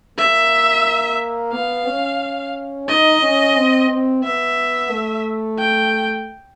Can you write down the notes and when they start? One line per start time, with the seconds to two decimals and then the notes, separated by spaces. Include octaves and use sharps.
0.18 A#3 E5
1.53 B3 F5
1.87 C#4
2.89 D#4 D#5
3.22 C#4
3.56 C4
3.90 C4
4.23 B3 E5
4.91 A3
5.59 G5